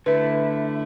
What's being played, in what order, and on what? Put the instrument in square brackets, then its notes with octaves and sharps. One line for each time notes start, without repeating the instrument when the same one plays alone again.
[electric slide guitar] D3 A3 E4 [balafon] B4